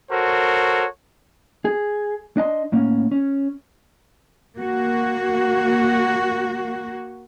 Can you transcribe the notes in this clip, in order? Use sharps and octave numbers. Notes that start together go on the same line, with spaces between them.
F#4 A4 A#4 C5 C#5
G#4
D4 D#5 A5 C6
A2 A#3 C#4
C#4
A#3 F#4